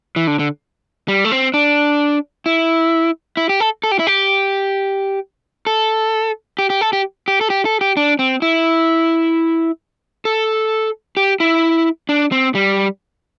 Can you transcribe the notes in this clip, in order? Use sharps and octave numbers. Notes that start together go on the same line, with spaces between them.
E3
D3
D3
G3
A3
C4
D4
E4
E4
G4
A4
A4
G4
E4
G4
A4
G4
G4
A4
G4
G4
A4
G4
A4
G4
D4
C4
E4
A4
G4
E4
D4
C4
G3